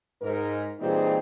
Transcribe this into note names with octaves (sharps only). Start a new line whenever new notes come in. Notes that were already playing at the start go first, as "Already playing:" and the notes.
G#2 A#4
A#2 E3 G3 C4 D#4 G#4